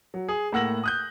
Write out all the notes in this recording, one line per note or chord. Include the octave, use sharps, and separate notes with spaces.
F#3
G#4
A2 A#3 F#5 E6 A#6 F#7
D#6 F#6 G6